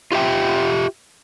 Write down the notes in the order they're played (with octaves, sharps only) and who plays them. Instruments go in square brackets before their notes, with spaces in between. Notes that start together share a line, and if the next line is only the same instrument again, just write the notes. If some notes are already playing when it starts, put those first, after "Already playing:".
[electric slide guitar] F4 G4 E5 G5